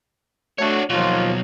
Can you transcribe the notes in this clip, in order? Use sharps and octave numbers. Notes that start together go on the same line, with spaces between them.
A3 D4 F#4 C#5
D#2 B2 F3 F#3 F4